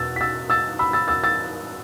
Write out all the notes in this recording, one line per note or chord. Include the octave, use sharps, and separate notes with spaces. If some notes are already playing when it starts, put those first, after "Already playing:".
Already playing: E2 B2 E6 A6
B6
E6 A6
E6 A6
B5 E6
E6 A6
E6 A6
E6 A6